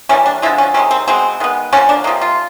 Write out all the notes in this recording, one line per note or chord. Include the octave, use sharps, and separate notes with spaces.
E3 G3 A#3 C#4
D4
D3 F3 G#3 E4
C#4
C3 D#3 G#3 C#4
C4
B2 G#3 B3 C4
D#3 G#3 B3
D3 F3 A#3 C#4
D4
C3 F3 A#3 D#4
F4